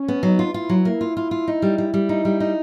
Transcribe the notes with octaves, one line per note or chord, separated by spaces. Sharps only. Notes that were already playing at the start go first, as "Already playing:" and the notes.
Already playing: C#4
B3
F#3 D#4
F4
E4 F4
F#3
A#3 E4
F4
F4
F4
D#4
G3
G3
G3
D#4
G3
D#4